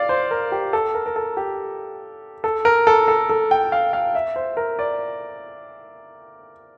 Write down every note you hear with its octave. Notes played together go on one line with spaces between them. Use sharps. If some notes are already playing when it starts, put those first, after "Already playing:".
Already playing: D5 F5
C5
A#4
G4
A4
A#4
A#4
A4
G4
A4
A#4
A4
A4
A4
G5
F5
F5
E5
C5
A#4
D5